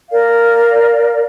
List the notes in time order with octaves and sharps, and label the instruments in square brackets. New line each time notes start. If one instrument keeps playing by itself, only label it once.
[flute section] A#4 D5 F5